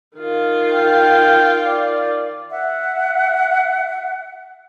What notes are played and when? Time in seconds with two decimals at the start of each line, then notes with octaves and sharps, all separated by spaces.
0.17 D#3 F4
0.73 G5
1.64 D5
2.50 E5 F#5